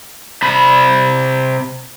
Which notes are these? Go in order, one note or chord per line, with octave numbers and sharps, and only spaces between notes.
C3 B5